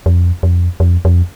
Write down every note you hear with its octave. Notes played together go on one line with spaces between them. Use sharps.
F2
F2
F2
F2